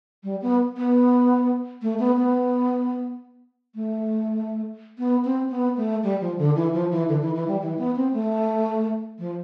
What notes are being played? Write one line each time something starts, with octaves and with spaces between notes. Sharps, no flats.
G3
B3
B3
A3
B3
B3
A3
B3
C4
B3
A3
G3
F3
D3
E3
F3
E3
D3
E3
E3
G3
E3
B3
C4
A3
F3